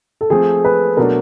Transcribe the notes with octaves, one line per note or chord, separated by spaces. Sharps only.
A4
F3 A3 C4 G#4
B4
B2 F#3 A3 D4 A#4